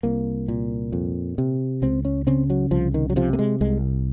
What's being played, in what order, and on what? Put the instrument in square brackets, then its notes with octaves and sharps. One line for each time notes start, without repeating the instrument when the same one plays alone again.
[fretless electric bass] C2 A#3
A#2
F2
C3
C#2 C4
C#4
C#3 C4
F#3
C2 F3
D#3
F#3
C3 F3
A#3
G#3
C2 G#3